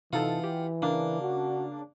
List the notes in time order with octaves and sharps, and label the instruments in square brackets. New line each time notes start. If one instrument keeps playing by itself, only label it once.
[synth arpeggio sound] C3 D#4 A4 [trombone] E3 [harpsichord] F4 F#5
[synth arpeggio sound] G4
[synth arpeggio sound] C#3 D4 [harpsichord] A#3
[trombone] F#4